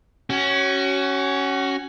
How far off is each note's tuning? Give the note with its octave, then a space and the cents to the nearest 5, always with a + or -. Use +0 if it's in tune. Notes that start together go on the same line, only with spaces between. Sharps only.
C#4 +0 F#4 +30